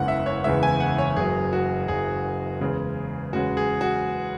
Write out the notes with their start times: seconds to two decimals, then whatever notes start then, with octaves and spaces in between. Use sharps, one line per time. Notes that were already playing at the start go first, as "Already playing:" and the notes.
Already playing: F#1 E2 C#3 E3 G#3 F#5
0.08 E5
0.26 C#5
0.44 F#1 E2 C#3 E3 G#3 E5
0.63 G#5
0.80 F#5
0.98 C#5
1.16 F#1 F#2 F#3 G#4
1.53 F#4
1.88 F#1 F#2 F#3 G#4
2.60 E2 C#3 G#3 C#4
3.33 E2 C#3 G#3 C#4 F#4
3.57 G#4
3.81 F#4